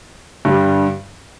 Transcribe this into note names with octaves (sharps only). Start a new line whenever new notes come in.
G2 D3 G3